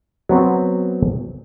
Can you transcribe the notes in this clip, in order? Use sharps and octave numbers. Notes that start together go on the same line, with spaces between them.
F#3 B3 C4